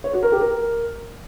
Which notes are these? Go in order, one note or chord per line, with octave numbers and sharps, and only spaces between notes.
C#5
F#4
A#4
G4
A#4